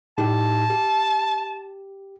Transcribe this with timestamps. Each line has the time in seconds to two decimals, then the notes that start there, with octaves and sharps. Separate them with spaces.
0.18 A2 D#4 G4 A5
0.70 G4